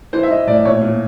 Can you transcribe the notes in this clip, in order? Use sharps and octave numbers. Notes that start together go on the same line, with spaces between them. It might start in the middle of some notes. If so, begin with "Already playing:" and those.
E3 C5
E5
E3 D#5
A2 D5
A#2 C#5
A#2